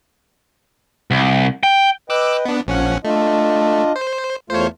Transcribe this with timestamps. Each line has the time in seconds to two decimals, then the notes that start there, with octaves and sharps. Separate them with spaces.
1.11 C2
1.63 G5
2.10 B4 D#5 G5 D6 E6 F#6
2.45 B3 D4
2.67 A#1 F3 C#4 F#5
3.05 A3 D4 F4 D#5
3.96 C5
4.50 E2 A3 F4 C5 C#5